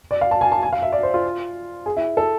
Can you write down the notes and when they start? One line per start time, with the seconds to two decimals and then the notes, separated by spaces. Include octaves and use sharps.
0.11 D5
0.21 F5
0.31 A5
0.41 G#5
0.52 A5
0.63 G#5
0.73 F5
0.82 E5
0.92 D5
1.03 C5
1.14 F4
1.86 G#4
1.96 E4
2.17 A4